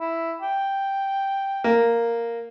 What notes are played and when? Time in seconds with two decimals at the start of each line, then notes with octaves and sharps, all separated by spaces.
0.01 E4
0.42 G5
1.64 A#3